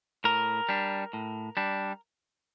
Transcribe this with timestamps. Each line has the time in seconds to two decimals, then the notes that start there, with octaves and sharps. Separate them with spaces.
0.24 A2 A#4
0.69 G3 D4
1.13 A2
1.57 G3 D4